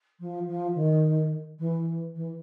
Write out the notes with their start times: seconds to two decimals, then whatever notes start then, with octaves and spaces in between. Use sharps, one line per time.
0.20 F3
0.48 F3
0.75 D#3
1.59 E3
2.15 E3